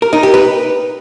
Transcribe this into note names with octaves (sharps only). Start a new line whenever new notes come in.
A#4
D#4
G4
B4